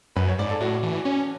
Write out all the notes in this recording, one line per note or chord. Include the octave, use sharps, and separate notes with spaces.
F#2 B4
C#5
G#2 D5
A4
A2 F#4
E3
C#4